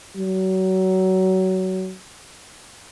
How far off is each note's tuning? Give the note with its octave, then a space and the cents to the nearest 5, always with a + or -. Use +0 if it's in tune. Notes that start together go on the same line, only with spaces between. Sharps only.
F#3 +25